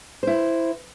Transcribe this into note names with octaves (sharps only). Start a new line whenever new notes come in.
E4 C5